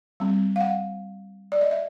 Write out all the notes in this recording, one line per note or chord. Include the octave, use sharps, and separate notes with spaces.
G3 C4
F5
F#5
D5
D#5
E5